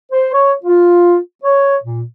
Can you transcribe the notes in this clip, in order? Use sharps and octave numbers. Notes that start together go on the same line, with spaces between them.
C5
C#5
F4
C#5
A#2